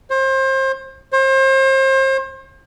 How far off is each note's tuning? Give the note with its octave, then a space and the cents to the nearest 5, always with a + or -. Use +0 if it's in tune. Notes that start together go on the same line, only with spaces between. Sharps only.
C5 +30
C5 +35